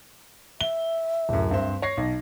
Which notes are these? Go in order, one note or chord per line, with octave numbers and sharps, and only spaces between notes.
E5 G7
D1 F#2
G2 C4 C5
C#5 A#6 C7
B1